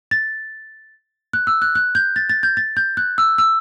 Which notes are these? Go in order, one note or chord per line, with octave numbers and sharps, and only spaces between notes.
A6
F#6
E6
F#6
F#6
G6
A6
A6
G6
A6
G6
F#6
E6
E6